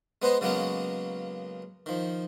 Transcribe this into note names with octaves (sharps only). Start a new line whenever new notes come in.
G#3 B3 B4 C5 D#5
C#3 F#3 G#3 A#3 B3 C#4
D#3 F3